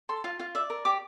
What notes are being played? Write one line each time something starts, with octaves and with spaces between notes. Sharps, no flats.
A4 C6
F4 F5
F4 F5
D5 E5
A#4
G4 D6